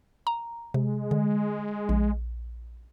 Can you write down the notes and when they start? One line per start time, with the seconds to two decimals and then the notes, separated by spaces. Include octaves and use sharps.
0.27 A#5
0.74 C3 G#3
1.11 D3
1.89 A#1